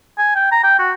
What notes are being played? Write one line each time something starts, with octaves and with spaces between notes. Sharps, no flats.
G#5
G5
A#5
G5
F#4